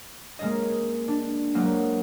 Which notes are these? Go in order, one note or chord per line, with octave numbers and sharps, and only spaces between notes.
G#3 A#3 C#4 G#4 D#5
D4
F#3 G#3 A#3 C4